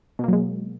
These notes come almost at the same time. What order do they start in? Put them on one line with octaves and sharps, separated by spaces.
B2 A#3 F#3 G#3